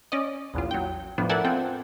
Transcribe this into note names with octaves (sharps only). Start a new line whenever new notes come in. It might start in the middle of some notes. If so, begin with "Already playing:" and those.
C#4 D5 D#5
A#1 E2 F4
F#3 G5
A2 F3 B3 D4
A4 A#4 D5 E5 F#5 G#5
C4 F4 A4 G5